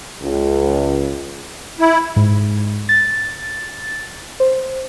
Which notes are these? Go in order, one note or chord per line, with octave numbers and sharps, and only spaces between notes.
C#2
E4
G#2
A6
C5